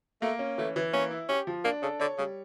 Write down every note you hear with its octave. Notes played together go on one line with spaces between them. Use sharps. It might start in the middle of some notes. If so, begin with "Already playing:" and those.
A3 A#3
C#4
E3 A3
E3
A#3 C#4
E4
C#4 G4
F3
A#3 D4
C#3 A4
D3 C#5
C#3 G3